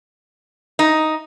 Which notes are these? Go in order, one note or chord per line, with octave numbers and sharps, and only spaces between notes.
D#4